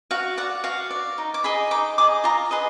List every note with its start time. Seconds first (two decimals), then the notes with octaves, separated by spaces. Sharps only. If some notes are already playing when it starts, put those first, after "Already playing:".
0.11 F#4 F5
0.38 D5 F#5
0.64 F#4 F5
0.91 D5
1.18 D#4
1.34 D6
1.44 G#4 D#5 B5
1.71 D#4 D6
1.98 G#4 D#5 D6
2.24 F4 A#5
2.51 G#4 B4 D#5